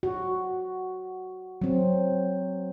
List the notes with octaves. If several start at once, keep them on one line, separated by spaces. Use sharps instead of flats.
F#4
F#3 C4